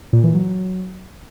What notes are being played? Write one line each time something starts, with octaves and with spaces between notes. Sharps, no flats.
A#2
E3
F#3